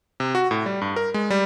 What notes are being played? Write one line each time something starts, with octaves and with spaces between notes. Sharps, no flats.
C3
F#4
A2
G3
G2
A#4
G#3
G3